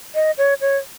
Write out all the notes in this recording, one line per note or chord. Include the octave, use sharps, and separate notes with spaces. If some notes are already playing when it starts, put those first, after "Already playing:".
D#5
C#5
C#5